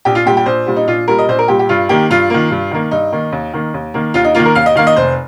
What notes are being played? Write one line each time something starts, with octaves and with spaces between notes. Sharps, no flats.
A#1 G4
F4
A#2 G3 G4
G4
A#1 C5
A#2 G3
D#4
A#1 F4
A#2 G3 A#4
D#5
A#1 C5
A#4
A#2 G3 G4
G4
G2 F4
D#3 A#3 G4
G2 F4
D#3 A#3
G2
D#3 A#3
G2 D#4
D#3 A#3
D#2
D#3 A#3
D#2
D#3 A#3
D#2 F4
D#4
D#3 A#3 F4
A#4
D#2 F5
D#5
D#3 A#3 F5
D#5
F1 C5